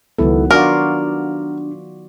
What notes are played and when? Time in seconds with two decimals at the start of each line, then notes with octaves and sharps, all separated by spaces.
0.18 C#2 D#3 F#3 B3 E4 A4
0.51 D4 F4 F#4 A#4 D5